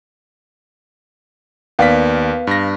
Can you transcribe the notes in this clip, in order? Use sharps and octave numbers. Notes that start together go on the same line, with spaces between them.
D#2 B3 D5 F5 B6
G2 A#6